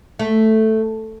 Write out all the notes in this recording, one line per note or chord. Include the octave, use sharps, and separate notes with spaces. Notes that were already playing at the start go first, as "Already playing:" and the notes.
A3